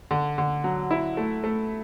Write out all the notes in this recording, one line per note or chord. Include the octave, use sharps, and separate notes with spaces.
D3
D3
F#3
E4
A3
A3